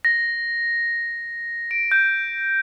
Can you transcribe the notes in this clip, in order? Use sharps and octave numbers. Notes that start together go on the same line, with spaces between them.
A#6
D7
G6